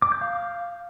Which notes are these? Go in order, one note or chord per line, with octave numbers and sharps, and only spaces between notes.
D6
G6
F5